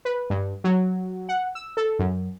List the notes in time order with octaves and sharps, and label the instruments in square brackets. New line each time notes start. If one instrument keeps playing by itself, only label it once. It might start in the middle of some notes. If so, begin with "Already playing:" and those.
[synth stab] B4
G2
F#3
F#5
E6
A4
F#2